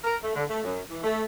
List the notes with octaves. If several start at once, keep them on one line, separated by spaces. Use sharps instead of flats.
A#4
A3
D3
A3
F#2
E3
A3